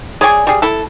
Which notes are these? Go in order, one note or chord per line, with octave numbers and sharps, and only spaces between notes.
G#4 C#5 D5 G#5
G3 G#4
E4 A4